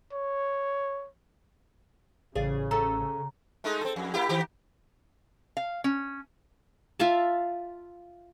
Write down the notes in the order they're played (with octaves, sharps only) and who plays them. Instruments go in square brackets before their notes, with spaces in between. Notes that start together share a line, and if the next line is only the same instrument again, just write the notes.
[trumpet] C#5
[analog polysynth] A1 [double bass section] C#3 [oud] G#4 D5 F5
[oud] C#4 A4 [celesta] A#5
[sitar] G#3 A3 D#4
C4 A4
F2
A#3 E4 G4
D#3 G4
[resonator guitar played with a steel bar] F5
C#4
[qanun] F4 E5 F5 A5